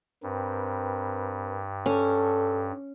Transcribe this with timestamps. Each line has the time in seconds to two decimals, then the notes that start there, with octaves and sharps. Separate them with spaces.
0.23 G2 C4 A#4 B4
1.86 C#4 A4